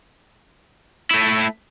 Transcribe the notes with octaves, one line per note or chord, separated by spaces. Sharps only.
A3 E4